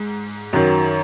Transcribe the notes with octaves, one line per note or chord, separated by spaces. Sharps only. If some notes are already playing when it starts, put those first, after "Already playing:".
Already playing: G#2
F#2 D#3 F#3